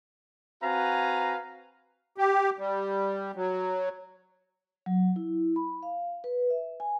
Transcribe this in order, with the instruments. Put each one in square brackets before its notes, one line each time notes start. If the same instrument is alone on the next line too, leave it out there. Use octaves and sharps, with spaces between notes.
[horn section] C4 F#4 B4 F5 G#5 A#5
[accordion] G4
G3
F#3
[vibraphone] F#3
E4
B5
F5
B4
E5
G#5